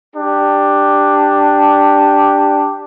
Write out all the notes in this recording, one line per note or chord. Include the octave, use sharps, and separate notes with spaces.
D4 G4